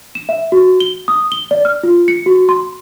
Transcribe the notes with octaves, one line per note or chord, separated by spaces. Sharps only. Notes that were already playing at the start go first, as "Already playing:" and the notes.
E7
E5
F#4
G7
D#6
G7
D5
F6
F4
C#7
F#4
C6